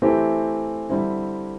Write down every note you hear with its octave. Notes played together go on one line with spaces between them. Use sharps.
E3 A3 C4 E4 G4
D3 G3 C4 E4